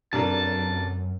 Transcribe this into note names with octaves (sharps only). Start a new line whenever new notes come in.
F1 F#2 D4 A#4 A5